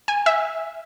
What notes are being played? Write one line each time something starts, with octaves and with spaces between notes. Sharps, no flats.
G#5
E5